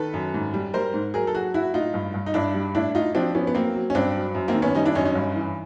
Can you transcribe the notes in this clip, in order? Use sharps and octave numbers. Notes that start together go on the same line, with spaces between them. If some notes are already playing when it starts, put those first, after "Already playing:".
Already playing: D#3 A4 B4
F#2
G#2
G3
G3 A#4 C5
G#2
F#3 G#4 A#4
A4
F#3 F#4 G#4
F#3 E4 F#4
A2 D#4 F4
G2
G2
D#4
G2 D4 E4
G3
A2 D4 E4
A2 D#4 F4
F3 C4 D4
F3 B3 C#4
B3
F#3 A#3 C4
F#3
C#4
G2 C4 D4
F#3
F#2
A#3 C4
D#3
B3 C#4
G3 C#4 D#4
D4 E4
F#2 C#4 D#4
C#4 D#4
G2
E3